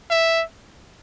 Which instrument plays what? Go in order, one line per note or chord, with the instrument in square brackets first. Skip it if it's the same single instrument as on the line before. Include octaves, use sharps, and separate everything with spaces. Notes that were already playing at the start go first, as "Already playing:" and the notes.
[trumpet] E5